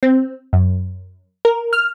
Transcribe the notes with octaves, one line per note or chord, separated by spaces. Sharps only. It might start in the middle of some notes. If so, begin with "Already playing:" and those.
C4
F#2
A#4
F6